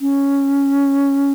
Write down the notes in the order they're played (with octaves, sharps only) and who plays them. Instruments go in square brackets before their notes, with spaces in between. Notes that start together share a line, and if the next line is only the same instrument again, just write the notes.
[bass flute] C#4